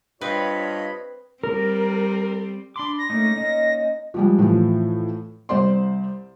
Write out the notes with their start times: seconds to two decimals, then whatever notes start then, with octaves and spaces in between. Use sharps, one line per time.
0.21 G2 C4 F4 B4 C#5 D#5 B5
1.44 G3 C4 A#4
2.76 D4 B5 C6 D6
2.99 A#6
3.10 A3 A#3 C#4 D#4
3.36 A#3 C#4 D#4 D#5
4.14 F3 G3 G#3
4.39 A2 E3 F3
5.49 C2 C5 D5 C6